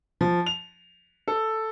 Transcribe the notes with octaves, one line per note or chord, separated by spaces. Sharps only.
F3
F7
A4